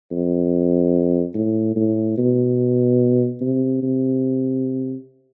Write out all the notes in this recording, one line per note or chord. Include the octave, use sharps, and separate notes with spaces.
F2
A2
A2
B2
C3
C3